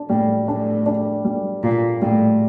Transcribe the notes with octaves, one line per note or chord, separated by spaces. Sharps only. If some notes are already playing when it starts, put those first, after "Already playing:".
Already playing: D4
A2 G3
A2 D4
D4
G3
A#2 F4
A2 G3